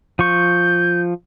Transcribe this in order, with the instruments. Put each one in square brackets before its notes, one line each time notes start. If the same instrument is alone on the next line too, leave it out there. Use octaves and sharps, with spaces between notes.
[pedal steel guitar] F3 C#6 [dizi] G6